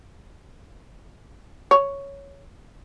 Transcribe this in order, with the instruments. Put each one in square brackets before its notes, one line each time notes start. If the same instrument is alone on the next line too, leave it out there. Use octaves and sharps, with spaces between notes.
[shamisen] C#5